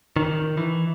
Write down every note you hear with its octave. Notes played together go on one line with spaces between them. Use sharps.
D#3
E3